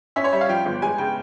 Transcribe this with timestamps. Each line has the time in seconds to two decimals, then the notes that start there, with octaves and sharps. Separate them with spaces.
0.16 C#4 E5
0.24 C#5
0.32 G3 E5
0.41 F5
0.49 F3 G5
0.66 G1
0.82 G#3 G#5
0.98 C#3 G5